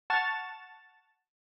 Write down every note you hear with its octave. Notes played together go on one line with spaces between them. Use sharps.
F#5 A5 C#6 F6 A6 E7